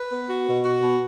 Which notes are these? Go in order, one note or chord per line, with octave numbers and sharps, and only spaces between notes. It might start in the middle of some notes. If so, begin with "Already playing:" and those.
Already playing: B4
B3
F#4
B2
F#4
B2